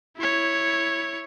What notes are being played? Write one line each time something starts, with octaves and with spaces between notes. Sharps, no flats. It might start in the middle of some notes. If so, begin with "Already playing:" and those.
E4 C#5